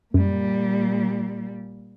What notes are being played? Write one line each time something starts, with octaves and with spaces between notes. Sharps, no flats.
F#2 A#2 G3